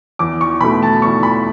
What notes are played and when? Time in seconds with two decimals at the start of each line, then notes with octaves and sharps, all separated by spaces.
0.19 E2 D6
0.41 C#6
0.61 B2 A3 B5
0.83 A5
1.02 E2 C#6
1.23 B5